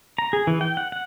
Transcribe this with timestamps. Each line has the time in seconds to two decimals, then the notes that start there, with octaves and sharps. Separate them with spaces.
0.18 A#5
0.33 G#4
0.47 E3
0.61 G5
0.77 F#5
0.92 F#5